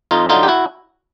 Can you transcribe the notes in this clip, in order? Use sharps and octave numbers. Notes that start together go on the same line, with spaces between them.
F2 D#4 F4
D3 F#3 D#4 F4
G4
E4 F#4